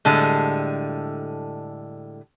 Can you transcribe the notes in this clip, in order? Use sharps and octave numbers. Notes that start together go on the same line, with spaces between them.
A2 D3 G3 G#3